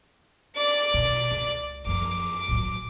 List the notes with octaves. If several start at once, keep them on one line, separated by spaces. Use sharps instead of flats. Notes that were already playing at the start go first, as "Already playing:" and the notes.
D5 D6
B2
C#2
F#2 F3 D6
A2 F#3